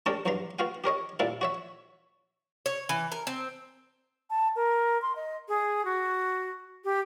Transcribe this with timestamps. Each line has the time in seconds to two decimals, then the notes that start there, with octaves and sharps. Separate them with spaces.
0.06 G#3 C#4 D4 G4 A4 A#4
0.26 B1 E2 G2 F#3 A#5 C6
0.59 B3 F4 F#4 F5 G5
0.84 G4 A#4 C#5 D#5
1.20 A#2 G3 A#3 C4 E4 A4
1.41 F#4 C#5 E5
2.66 C#5
2.89 E3
3.12 A#4
3.27 C4
4.30 A5
4.56 A#4
5.02 C6
5.16 D#5
5.48 G#4
5.85 F#4
6.84 G4